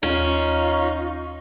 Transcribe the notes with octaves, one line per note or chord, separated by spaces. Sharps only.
D#2 C#4 D#4 F4 C#6